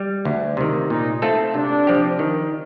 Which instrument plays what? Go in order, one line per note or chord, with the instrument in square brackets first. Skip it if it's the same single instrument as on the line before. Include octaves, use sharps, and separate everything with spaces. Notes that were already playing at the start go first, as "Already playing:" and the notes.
Already playing: [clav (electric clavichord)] G3
D2
C3 D#3
[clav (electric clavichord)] A#2 [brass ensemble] D#4
[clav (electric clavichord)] A3 C4 F4 A4
[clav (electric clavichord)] C3 [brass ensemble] D4
[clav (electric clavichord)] F3 C4 G4
D#3